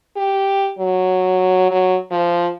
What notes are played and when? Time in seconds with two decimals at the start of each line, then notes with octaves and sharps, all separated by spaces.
0.16 G4
0.79 F#3
1.71 F#3
2.11 F3